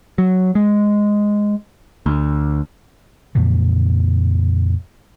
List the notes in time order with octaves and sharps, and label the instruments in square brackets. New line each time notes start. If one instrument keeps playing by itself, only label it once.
[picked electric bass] F#3
G#3
D2
[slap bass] F2 A#2 C#3 E3